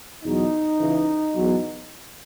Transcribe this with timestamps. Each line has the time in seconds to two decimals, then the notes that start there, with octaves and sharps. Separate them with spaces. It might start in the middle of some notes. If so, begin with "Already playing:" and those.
0.24 E2 B2 F#3 D#4
0.79 C#2 C#3 E3
1.34 E2 B2 F#3